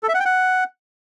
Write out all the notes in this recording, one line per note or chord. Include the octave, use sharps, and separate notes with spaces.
A4
E5
F#5
G5
F#5